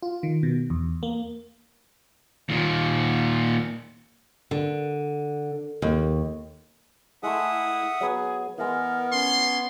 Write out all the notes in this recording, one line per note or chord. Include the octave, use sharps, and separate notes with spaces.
F4
D#3
B2
E2
A#3
D#2 A#2
D3
D#2
G#3 A3 E4 E5 F#5 D#6
F#3 B3 G#4
E3 G#3 B3 A#4
C#4 C6